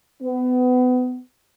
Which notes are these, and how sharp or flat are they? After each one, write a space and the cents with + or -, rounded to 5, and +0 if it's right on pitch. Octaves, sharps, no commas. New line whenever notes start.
B3 +30